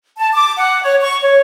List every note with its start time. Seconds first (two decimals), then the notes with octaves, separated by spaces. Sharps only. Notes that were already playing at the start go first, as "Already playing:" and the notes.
0.18 A5
0.33 D6
0.57 F#5
0.83 C#5
1.01 C#6
1.22 C#5